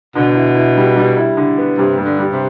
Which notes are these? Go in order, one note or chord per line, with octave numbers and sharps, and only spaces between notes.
B2 D3
E4
E4
G3
G3
E4
D3
B3
G2 C3
G2
D3
G3
C3